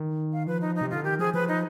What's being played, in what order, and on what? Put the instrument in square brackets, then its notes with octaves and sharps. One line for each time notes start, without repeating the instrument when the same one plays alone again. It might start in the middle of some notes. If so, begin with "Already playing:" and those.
Already playing: [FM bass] D#3
[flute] F5
[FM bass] F3 [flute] B4
[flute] D#4
D#4
[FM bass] C3
[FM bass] D3 [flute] F4
[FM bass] D#3 [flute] G4
[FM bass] F3 [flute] G#4
[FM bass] F3 [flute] B4
[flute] D#4